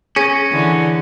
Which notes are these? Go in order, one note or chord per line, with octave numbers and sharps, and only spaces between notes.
C#4 G#4 A#6
D3 E3